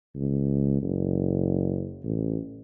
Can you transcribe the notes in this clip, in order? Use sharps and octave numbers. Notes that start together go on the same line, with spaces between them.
C#2
F#1
A1